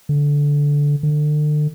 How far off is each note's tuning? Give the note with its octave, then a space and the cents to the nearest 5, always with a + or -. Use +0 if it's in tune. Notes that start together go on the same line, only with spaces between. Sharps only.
D3 -15
D3 +35